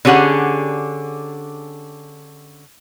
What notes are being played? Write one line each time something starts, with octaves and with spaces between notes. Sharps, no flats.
D3 C#4 G4 G#4 F#5